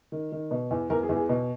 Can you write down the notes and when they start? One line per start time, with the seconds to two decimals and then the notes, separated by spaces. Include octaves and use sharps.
0.12 D#3
0.32 D#3
0.51 B2
0.71 E2
0.90 E2 A#4
1.03 G#4
1.09 E2
1.16 G#4
1.29 B2